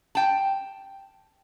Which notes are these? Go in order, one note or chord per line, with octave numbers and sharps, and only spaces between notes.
G5 A5